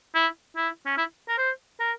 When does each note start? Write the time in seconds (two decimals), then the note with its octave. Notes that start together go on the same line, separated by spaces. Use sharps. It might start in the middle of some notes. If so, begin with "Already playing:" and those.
0.15 E4
0.56 E4
0.86 C#4
0.98 E4
1.28 A#4
1.38 C5
1.80 A#4